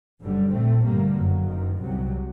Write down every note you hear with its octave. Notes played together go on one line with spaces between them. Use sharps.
F#1 F#2 D3 G3
A#1 A#2 A3 C4
A1 G2 D3 G3 A#3
F#1 F#2 F#3
F#1 F#2 D#3
C2 C3 F#3